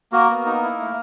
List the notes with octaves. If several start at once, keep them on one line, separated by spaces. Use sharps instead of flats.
A#3 F#4 A#4
B3
D#4
E4
A3